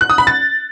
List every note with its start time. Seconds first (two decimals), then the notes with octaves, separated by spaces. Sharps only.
0.01 F#6
0.10 D#6
0.18 B5
0.27 A6